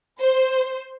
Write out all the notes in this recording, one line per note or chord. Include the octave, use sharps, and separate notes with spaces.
C5